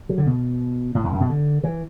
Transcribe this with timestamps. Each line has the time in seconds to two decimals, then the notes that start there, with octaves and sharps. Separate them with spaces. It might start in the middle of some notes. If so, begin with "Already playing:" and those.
0.09 F#3
0.18 D3
0.26 B2
0.95 A2
1.04 E2
1.12 F#2
1.20 B2
1.29 D3
1.63 E3